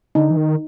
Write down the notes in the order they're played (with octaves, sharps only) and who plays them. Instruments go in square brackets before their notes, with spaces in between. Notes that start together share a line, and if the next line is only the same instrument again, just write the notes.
[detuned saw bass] D3 [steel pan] D#4
[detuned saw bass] E3
D#3